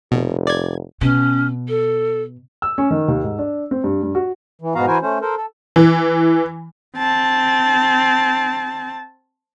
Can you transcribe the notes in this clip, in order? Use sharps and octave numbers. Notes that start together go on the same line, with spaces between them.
F1 B2
D5 G#6
B2 C#4
A4
E6
C#4
D#3
D#2
G#2
D4
C4
G2
G2
F#4
E3
G#2 B2 B3 F#4 F5 A#5
E3 E4 F#4 A#4 C5 G#5
A3 C#4 C5
A4 A#4 C5
A4
E3
C4 A5